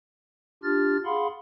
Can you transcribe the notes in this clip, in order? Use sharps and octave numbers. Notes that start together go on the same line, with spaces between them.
D4 F4 G4 F6 A6
G#4 F5 F#5 B5 C6